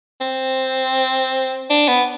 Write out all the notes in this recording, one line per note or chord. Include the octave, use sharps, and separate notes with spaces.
C4
D4
B3